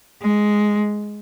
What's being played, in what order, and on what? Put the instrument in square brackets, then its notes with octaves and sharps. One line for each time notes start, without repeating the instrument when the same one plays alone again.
[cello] G#3